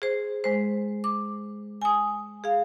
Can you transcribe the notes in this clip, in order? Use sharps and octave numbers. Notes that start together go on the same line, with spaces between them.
G#4 C5
G#3 C5
D6
G#5 D#6
G#4 F5